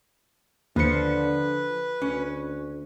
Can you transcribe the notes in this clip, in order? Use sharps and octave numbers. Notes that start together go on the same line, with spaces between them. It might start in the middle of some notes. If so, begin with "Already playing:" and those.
D#2 D3 F3 B4 C5 C#7
D2 C#4